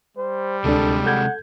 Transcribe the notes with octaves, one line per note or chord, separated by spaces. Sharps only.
G3 C5
D2 C3 G#3 D4 A4
A4 F#5 G6 G#6